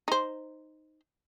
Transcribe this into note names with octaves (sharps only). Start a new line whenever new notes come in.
D#4 C5